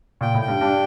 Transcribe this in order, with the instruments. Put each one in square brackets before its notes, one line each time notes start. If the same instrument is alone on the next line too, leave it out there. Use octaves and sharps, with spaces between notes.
[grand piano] A#2 [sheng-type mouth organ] G5
[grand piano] A2
[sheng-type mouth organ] G5
[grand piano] G2
[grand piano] G2 [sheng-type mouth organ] D4